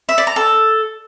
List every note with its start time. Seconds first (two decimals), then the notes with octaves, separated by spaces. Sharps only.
0.09 E5
0.18 D5
0.27 A#5
0.36 A4